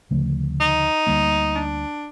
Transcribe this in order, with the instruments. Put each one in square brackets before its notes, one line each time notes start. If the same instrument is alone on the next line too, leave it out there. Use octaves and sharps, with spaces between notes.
[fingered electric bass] D2 C#3 F3 A3
[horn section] D#4
[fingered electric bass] D2 D3 G3 A#3
[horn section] D4